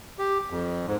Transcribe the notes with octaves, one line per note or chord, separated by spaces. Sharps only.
G4
F2
G#2